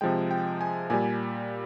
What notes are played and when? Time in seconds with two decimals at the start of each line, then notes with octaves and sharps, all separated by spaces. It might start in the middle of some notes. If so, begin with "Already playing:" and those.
0.01 C3 F3 G#3 G5
0.31 G5
0.61 G#5
0.90 A#2 G3 G#5